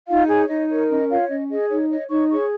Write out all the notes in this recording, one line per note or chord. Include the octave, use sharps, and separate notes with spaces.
D#4 F4 F5
G#4 C#5 G#5
D#4 D#5
A#4 C#5
C#4 D#5
F4 C#5 F5
C#4 D#5
G#4 D#5
D#4 C#5
C#5 D#5
D#4 C#5 C#6
G#4 C#5 C#6